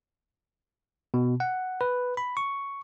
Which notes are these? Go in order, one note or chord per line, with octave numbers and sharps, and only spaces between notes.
B2
F#5
B4
B5
C#6